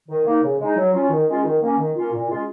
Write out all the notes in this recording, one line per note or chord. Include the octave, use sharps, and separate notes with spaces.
D#3
A#3 D#4
C#3
G#3 D#4
F#3
C#4 F4
D#3
G#3 C#4 F4
D#3
A#3 C#4
D#3
A#3 C#4 F4
A#2
G#3 C#4 F4